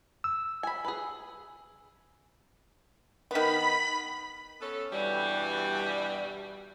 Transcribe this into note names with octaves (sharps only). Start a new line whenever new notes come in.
E6
G#5 B5
G#4 B4
D#3 B3 B5 B6
B3 C#4 A4
G2 B2 E3 G3